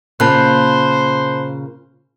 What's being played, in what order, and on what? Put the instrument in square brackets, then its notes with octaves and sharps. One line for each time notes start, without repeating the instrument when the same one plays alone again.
[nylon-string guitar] A#2 C#3 A#3 [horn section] C5 [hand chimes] A5 B5 F#6